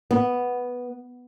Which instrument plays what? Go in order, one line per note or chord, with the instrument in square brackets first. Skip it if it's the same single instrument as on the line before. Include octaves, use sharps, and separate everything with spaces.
[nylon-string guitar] B3